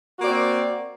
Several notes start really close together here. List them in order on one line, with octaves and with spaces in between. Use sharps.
F#4 A#3 D5 C4